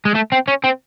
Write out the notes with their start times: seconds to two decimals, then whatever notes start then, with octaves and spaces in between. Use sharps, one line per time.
0.05 G#3
0.15 A3
0.32 C4
0.48 C#4
0.64 C4